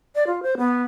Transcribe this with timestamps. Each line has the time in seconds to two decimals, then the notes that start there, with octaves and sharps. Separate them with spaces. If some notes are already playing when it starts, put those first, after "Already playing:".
0.15 D5
0.27 F4
0.43 C5
0.58 B3